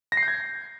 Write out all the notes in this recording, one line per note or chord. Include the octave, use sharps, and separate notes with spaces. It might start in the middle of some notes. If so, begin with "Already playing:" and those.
A#6
C7
G6
G#6